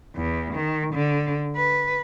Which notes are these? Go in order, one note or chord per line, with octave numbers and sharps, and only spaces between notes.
E2
D#3
D3
B4